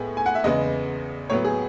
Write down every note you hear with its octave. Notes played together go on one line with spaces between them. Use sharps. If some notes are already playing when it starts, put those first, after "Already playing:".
Already playing: A2 G#3 B3 G#5
G#5
F#5
E5
E2 C#3 G#3 B3 D#5
A2 F#3 B3 C#5
G#4